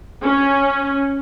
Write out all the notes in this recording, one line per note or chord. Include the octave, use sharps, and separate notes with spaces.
C#4